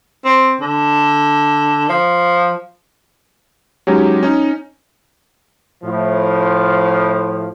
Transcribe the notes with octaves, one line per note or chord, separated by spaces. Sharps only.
C4
D3
F3
F#3 G#3 C#4 D#4 G4
C#4 D#4
A2 F3